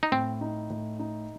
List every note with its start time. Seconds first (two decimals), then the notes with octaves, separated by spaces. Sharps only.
0.03 D#4
0.12 A2 C4
0.41 D#4
0.70 A2
0.99 D#4